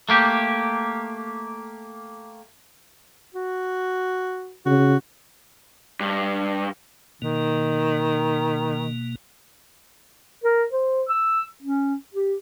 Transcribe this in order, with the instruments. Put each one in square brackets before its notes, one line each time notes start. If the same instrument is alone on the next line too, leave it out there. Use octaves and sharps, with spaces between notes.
[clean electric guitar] A3 A#3 G4
[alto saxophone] F#4
[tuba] C#3 [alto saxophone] F#4
[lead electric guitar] G2
[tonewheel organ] B2 A#3 [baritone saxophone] D#3
[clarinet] A#4
C5
E6
C#4
G4